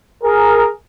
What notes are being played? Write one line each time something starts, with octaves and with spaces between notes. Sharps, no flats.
G#4 A#4